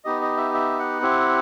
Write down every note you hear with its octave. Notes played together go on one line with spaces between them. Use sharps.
B3 D#4 G4 D#5
D#5
E5
E5
F#5
C4 E4 G4